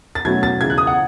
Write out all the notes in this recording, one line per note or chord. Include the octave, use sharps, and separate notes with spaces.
A6
B2 F#3 A3 C#4 E4 G#6
A6
C#2 C#3 E3 G#6
F#6
D#6
F#5